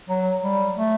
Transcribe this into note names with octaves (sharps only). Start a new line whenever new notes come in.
F#3
G3
A3